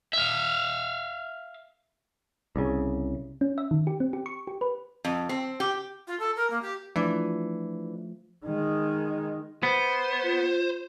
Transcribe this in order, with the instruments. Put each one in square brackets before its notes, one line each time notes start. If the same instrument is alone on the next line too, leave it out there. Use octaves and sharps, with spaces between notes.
[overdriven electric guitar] E5 F5
[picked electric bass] C2 C#3
[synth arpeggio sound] C#4
E5
D#3
G4
C4
G4
C#6
G4
B4
[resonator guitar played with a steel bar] F2
C4
G4
[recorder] F4
A4
A#4
A#3
G4
[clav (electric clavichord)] E3 [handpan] F3 A3 [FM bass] D4
[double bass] D#3 G#3
[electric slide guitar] B3 [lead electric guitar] C5
[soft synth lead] F4